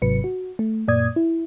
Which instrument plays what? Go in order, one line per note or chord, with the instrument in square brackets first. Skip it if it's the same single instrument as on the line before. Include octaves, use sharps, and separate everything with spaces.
[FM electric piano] G#1 G#2 C3 F#3 B4 C#7
F#4
A3
F#2 A#2 A#3 D5 D#6 G#6
E4